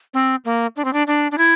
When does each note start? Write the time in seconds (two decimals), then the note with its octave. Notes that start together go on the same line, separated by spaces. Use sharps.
0.14 C4
0.45 A#3
0.76 D4
0.85 C4
0.93 D4
1.07 D4
1.32 D4
1.38 E4